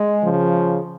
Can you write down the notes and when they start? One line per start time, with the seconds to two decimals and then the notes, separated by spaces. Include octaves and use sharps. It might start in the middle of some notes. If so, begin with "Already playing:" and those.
Already playing: G#3
0.23 C#3 F3